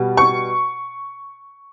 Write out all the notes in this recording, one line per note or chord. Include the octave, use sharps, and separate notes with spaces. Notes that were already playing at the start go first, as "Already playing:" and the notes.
Already playing: B2 G3
C#6